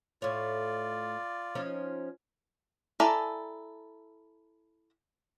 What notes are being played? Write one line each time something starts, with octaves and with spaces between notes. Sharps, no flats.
A2 F4 C#5 D5
F3 C#4 D#4
E4 A4 D5 G#5 A#5